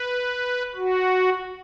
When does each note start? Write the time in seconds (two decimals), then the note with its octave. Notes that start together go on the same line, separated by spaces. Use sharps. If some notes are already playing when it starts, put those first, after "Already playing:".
Already playing: B4
0.75 F#4